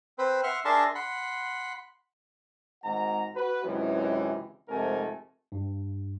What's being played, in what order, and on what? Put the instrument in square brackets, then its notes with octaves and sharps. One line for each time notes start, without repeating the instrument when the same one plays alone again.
[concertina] C4 B4 C5
E5 F#5 C6 F6
D4 G#4 A#4 E5 A5 C6
F#5 B5 C6
[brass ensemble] G#1 G#2 F#5 A#5
F#4 B4
C#2 F#2 C3 D#3 E3
F2 G#2 C3 A3 A#4 G#5
[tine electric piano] G2